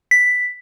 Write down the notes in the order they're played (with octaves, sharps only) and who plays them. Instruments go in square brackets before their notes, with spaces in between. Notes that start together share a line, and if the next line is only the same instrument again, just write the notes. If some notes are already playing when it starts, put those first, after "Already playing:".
[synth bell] B6